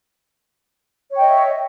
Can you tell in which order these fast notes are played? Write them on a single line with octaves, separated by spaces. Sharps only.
C#5 G5 D#5 E5